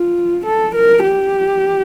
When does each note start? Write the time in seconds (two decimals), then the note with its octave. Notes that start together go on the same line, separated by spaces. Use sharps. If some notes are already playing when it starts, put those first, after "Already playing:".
Already playing: F4
0.46 A4
0.75 A#4
1.04 G4